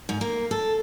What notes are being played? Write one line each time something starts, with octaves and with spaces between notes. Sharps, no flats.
G#2
A#3
A4